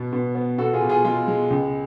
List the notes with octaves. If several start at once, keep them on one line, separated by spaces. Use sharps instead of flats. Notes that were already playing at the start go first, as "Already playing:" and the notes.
Already playing: B2 B3
B2
B3
B2 F#4 A4
F4 G#4
B2
F4 G#4
G#3 F4
G#3
C#2